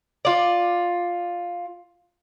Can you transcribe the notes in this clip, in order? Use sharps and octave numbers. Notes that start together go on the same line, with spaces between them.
F4 D5